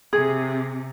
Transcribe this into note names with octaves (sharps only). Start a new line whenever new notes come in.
C3 G#4